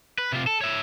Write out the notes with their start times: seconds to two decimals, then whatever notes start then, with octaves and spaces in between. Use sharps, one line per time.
0.18 B4
0.32 C3 F4
0.47 A4
0.61 C#5 E5